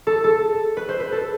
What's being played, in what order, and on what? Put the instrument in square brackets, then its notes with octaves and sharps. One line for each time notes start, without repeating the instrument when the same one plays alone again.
[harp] A4
A4
B4
C5
B4
A4